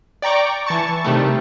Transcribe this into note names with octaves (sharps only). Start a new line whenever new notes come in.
D5 G5 A#5 C#6 D6
E3 A5 C#6
C3 D#3 G3 A3